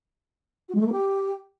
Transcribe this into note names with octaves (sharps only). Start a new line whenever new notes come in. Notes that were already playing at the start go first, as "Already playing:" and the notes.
F#4
G#3
A3
A#3
G4